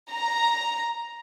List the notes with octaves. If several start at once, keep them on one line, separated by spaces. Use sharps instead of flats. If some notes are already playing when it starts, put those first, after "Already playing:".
A#5